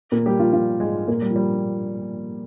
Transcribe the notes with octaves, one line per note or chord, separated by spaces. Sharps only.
A#2 A#3
G3 G4
F3 F4
F3 F4
G#2 G#3
A#2 A#3
G3
F3
G3